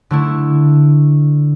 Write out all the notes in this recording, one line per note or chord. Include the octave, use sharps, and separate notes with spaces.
D3 A3 E4